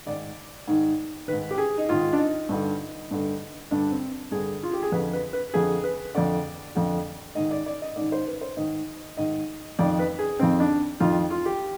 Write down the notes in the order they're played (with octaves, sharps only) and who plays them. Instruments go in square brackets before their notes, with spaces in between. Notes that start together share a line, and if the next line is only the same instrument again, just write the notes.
[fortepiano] G#2 D#3 D5
G#2 D#3
G#2 D#3 B4
G4
G#4
D#4
G#2 D#3 F4
D4
D#4
G2 D3
G2 D3
G2 D3 D4
C4
G2 D3 G#4
F4
G4
G#4
F2 D3 B4
B4
B4
F2 D3 G#4
B4
F2 D3 D5
F2 D3
G#2 D#3 D#5
D5
D5
D#5
G#2 D#3 D5
C5
B4
C5
G#2 D#3 D#5
G#2 D#3 D#5
F2 D#3 D5
B4
G#4
F2 D#3 C4
D4
F2 D#3 F4
F4
G4